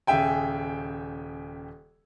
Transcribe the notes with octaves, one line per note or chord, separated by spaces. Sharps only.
D#1 C#3 G#4 E5 G5 G#5